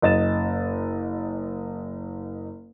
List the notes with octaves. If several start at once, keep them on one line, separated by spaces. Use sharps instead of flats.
F#1 D#5 A6 E7